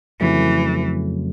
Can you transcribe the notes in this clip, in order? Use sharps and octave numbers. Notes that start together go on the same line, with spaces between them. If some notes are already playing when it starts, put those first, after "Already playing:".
F2 C#3 E3 F#3 A3